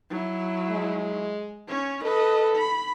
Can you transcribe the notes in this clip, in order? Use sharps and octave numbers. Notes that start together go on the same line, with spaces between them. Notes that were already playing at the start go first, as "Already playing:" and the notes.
F#3 E4
G#3
C#4 C#5
A4 B4 D#5
B5